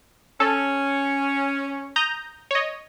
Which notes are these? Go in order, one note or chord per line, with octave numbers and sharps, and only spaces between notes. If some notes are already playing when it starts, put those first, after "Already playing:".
C#4 A4
A#5 D#6 G6
C#5 D#5